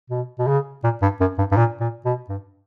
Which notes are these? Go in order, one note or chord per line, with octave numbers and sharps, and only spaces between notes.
B2
B2
C#3
A#2
G2
F#2
G2
G2
A#2
A#2
B2
G2